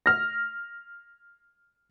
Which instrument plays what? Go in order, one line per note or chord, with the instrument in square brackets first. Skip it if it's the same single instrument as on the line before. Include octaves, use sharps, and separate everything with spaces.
[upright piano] F6 A#6